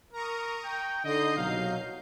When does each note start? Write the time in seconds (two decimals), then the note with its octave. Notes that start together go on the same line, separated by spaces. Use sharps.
0.13 A#4 A#5 C#6 D#6
0.65 G5
1.05 D3 D#4 D#5 G6 C7
1.37 C2 B2 F#3 F5